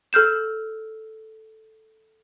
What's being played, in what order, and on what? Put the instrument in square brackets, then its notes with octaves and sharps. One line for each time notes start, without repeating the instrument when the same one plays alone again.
[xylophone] A4 F6 G6 E7